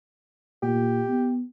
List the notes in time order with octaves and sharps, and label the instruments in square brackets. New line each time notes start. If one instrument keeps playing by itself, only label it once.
[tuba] A#2 [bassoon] G4
[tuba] B3